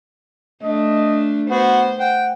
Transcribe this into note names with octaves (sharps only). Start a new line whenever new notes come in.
A3 D4 D#5
B3 F#4 C5
F#5 G5